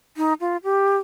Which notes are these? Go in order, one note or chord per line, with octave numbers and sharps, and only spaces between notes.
D#4
F4
G4